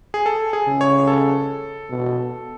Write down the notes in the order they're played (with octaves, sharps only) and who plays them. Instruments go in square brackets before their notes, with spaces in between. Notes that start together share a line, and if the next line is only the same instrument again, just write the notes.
[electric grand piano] G#4
A4
G#4
[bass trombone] C#3
[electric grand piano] C#5
A4
[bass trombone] B2